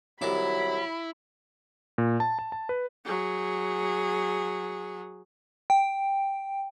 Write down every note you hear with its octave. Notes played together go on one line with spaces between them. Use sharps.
C2 D#3 F#3 E4 B5 D6
A#2
A5
A5
A5
B4
F#3 G#4
G5